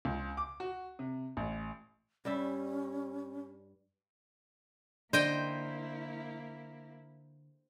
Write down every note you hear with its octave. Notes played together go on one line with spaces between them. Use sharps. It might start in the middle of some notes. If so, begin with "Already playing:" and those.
C#2
D6
F#4
C3
A1
G2 G3 C#4 E5
D3 A#3 E4 C5 D#5 G5